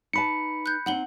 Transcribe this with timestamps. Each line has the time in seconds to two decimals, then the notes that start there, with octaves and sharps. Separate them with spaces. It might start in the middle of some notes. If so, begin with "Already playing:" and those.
0.13 D#4 B4 A5 B5 C#7
0.66 F#6 G6
0.86 C4 D4 D#4 F#5 F#7 G7